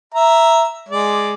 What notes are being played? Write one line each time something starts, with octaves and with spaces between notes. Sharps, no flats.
E5 A#5
G#3 D5